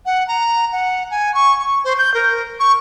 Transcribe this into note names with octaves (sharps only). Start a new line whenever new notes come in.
F#5
A#5
F#5
G#5
C#6
C#6
C5
G6
A#4
C#6